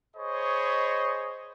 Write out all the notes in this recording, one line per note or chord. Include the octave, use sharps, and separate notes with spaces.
G#4 C5 C#5 D#5 B5 C#6